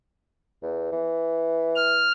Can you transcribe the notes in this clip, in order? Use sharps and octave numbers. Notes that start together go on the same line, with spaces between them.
E2
E3
F6